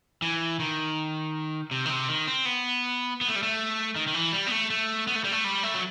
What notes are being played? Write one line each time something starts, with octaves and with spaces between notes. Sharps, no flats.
E3
D#3
C3
D#3
C3
D#3
C4
B3
B3
A3
G3
A3
D#3
D#3
E3
G3
B3
A3
A3
B3
A3
G3
A3
G3
A3
F#3